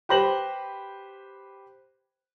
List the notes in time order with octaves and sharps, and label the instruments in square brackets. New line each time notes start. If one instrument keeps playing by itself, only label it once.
[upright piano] G4 B4 C5 A#6 F#7